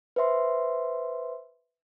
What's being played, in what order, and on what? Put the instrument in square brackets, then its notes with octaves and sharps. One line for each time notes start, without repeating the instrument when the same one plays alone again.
[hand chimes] B4 C5 E5 C6